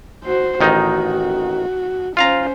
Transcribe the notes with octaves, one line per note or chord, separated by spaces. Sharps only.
F#4 C5
A1 D#3 D#4 F#4
C#4 F4 C5 F5 A#5